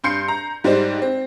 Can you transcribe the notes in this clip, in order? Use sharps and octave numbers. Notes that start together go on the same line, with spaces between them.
G2 C6 G6 C7 C#7
A#5
G#2 G3 D#4 C5
C4